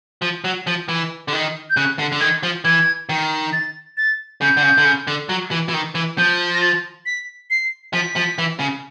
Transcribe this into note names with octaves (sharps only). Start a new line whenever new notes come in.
F3
F#3
F3
E3
D3
D#3
G6
C#3 F#6
D3
D3
D#3 G#6
F3
E3 G#6
D#3
A6
A6
C#3 G6
D3
C#3
D3
C#3
D3
F#3
E3
E3
D#3
E3
F3 G6
A#6
A6
B6
C7
F3 B6
F3
E3
C#3